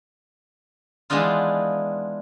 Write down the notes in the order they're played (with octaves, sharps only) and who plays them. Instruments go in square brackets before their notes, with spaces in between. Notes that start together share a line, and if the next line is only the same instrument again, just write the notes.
[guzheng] E3 G#3 B3 D4 D#4 F4